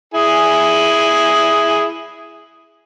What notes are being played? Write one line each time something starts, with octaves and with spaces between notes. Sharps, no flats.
E4 G#4 G#5